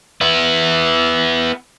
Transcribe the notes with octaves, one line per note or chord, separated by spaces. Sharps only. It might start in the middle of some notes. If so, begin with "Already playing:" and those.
B3 E4